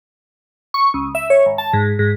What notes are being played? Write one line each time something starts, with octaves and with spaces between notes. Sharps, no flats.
C#6
C#2
E5
C#5
G#1
A5
G#2
G#2